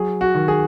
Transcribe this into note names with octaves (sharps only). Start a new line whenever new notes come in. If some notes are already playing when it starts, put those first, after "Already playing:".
Already playing: F#3 G#4
F#4
D#3
G#4